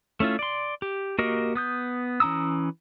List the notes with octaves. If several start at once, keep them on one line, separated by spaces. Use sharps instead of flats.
A3 C#4 E4 F4
D5 C6
G4
A#3 F#4 G4 A#4 D#5
B3 D#6 G6
E3 C#4 A#5 D#6 E6